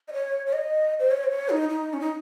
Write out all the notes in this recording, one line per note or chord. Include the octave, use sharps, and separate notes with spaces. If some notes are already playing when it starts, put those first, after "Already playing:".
D#5
C#5
C#5
D#5
C5
C#5
C5
C#5
D#4
D#4
C#4
D#4